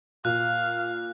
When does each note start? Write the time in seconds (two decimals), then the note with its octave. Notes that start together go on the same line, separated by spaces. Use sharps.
0.25 A#2 F5 F#6